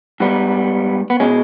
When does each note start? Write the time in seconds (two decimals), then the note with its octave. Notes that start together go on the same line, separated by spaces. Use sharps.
0.20 G#2 G3 B3
1.10 B3
1.20 B2 G#3 C#4